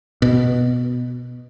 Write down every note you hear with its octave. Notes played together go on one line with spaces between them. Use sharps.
B2